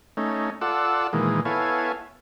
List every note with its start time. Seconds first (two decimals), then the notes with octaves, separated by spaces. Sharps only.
0.17 A3 C#4 D#4
0.61 F4 A4 D5 F#5 E6
1.13 A#2 D#3 E3 G#3
1.45 B3 E4 A4 C#5 F5 G#5